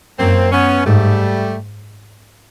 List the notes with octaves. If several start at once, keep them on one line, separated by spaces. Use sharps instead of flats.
F#2 A#3 C4
B3 C#4
G#2 G3 A3